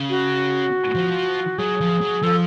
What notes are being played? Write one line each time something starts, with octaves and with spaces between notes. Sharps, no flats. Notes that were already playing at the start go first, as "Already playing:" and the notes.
Already playing: C#3
F#4
F3
F#3 G#4
F3
F#3
F3 A4